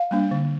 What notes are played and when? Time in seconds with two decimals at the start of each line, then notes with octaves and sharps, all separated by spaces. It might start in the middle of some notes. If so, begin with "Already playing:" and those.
Already playing: F5
0.11 G3 A#3 D4
0.31 D3